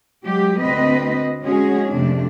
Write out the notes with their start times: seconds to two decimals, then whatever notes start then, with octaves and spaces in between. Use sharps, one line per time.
0.25 F#3 G#3 G4
0.61 D2 C4 B4 D#5
1.44 G#3 C#4 F#4 G#4
1.90 F2 C3 A3 D4